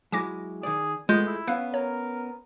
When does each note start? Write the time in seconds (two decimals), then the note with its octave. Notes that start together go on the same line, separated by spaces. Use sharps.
0.12 F#3 G#3 E4 G#5 D6 A#6
0.63 D#3 G#4 D5
1.09 G#3 A3 B3 F4 G#4 G6
1.27 E4
1.47 B3 C#4 F5 F#6
1.74 A#4 C#5